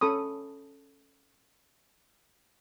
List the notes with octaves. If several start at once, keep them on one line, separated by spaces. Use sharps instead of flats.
C#4 A4 B5 C#6 D#6